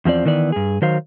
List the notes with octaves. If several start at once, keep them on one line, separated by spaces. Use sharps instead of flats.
E2 F3 C4 D5
D#3 E3 B3 D5
G2 G#4
D#3 F#3 C5 F5